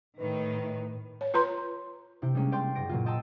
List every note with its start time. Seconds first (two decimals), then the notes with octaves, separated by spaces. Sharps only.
0.19 A2 D#3 B4
1.21 C#5
1.34 F4 B4 A#5 C6
2.22 C3 E4 G5
2.35 G3 G#3 A#3 C#4
2.52 D5 F5 G5 C6
2.75 F#1 A#6 D7
2.89 A#2 F#3 A#3 F4
3.06 D#5 G5 A5 A#5 C6 E6